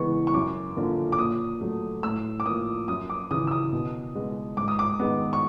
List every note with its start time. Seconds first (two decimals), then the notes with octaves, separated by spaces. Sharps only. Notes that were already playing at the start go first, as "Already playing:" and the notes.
Already playing: C#3 E3 G#3 B3 C#6
0.27 C#6
0.34 F#2 D6
0.77 D3 F3 A#3
1.12 D6
1.18 A#2 D#6
1.61 F#3 A3
2.03 A2 E6
2.40 D6
2.46 F3 A#3 D#6
2.88 F#2 D#6
3.10 D6
3.31 C#3 E3 D#6
3.47 E6
3.51 D#6
3.73 B2
4.15 G#3 B3
4.57 G#2 D6
4.68 D#6
4.79 D6
5.00 D#3 G#3 B3
5.33 C#6